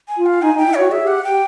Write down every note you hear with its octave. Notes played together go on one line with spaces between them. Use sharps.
G#5
F4
F5
D#4 G#5
D#4 G5
E4
F#4 C#5
G#4 E5
G4 F#5
G4 G5